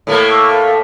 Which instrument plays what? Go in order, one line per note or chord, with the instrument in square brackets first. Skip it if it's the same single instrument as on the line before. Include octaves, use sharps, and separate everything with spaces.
[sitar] A2 A3 A#3
[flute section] C#6 D6 E6
A4 A#4 F5